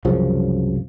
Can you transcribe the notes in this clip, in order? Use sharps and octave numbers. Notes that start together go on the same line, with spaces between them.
C2 F#2 C#3 F3